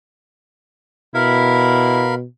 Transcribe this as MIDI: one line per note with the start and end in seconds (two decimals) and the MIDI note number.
1.15 2.25 47
1.15 2.02 64
1.15 2.15 70
1.15 2.15 77
1.15 2.15 83